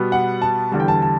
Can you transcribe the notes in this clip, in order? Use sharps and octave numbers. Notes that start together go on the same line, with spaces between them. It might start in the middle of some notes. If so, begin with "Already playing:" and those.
Already playing: B2 G3 B3
F#5
A5
E2 D3 G3 A5
G5
A5
A5